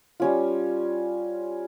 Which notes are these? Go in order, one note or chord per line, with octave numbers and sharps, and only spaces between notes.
G3 C#4 F4